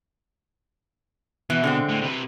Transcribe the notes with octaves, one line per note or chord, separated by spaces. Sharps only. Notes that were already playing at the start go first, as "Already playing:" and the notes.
B2 E3
D3 G#3 C4
A2
C3 B4